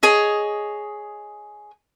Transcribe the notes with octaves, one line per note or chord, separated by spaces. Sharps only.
G#4 C#5 D#5